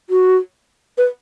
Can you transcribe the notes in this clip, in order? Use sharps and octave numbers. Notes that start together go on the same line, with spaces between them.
F#4
B4